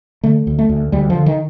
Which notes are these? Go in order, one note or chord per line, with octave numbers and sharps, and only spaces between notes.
D3 A3
D2
A3
D2
D2 G3
F3
D3
D#3